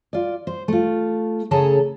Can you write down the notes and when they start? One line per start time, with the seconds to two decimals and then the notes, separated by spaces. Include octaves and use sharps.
0.13 F4 D5
0.47 C5
0.68 A3 F4
1.51 C#3 C#4 G#4 A4 A5 A#5